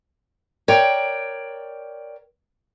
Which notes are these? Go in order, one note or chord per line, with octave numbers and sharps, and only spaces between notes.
A#4 C#5 D5 G5